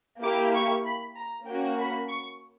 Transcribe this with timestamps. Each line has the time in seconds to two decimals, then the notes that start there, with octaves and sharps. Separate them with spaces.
0.23 A#3 E4 G4 D6
0.54 C#6
0.84 B5
1.16 A#5
1.46 A#3 C#4 F#4 G5
1.78 B5
2.09 C#6